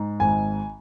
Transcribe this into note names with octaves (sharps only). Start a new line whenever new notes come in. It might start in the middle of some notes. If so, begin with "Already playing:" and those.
Already playing: G#2
G#1 G#5